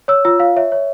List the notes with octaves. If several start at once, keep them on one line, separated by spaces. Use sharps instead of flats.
C#5 E6
F4 E6
F4 F5
C#5 E5
C#5